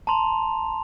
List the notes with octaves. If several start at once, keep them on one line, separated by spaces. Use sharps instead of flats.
A5 A#5 C6 F7